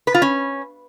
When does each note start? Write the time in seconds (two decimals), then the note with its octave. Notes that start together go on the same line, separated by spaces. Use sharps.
0.07 B4
0.14 F4
0.22 C#4